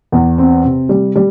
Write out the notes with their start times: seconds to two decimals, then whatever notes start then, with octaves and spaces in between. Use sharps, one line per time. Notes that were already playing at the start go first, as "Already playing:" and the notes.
0.12 E2
0.38 C4
0.64 C3
0.89 G3
1.15 G3